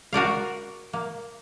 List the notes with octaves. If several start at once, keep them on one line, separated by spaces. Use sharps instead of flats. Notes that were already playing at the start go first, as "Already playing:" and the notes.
F#4 A#4 D5 F5
A#3